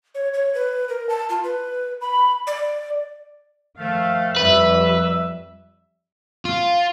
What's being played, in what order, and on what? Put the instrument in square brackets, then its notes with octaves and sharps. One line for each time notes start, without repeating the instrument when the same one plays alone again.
[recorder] C#5
C#5
B4
A#4
A5
F4
B4
B5
D5
[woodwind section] D#3 F3 A3 [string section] F5
[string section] F2 G3 [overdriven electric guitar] B4 [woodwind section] E5
[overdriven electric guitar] F4